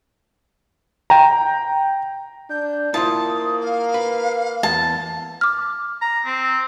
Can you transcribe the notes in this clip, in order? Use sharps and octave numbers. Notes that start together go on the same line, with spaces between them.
G5 A#5
D4 G6
A#3 E4 F4 C5 A5 D#6
F5
B4
E2 A5
D6 F6
A#5
C4